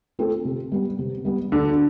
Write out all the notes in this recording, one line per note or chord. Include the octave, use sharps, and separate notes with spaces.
A3 C4 F4 A4
C3
G3 B3
C3
G3 B3
D2 D3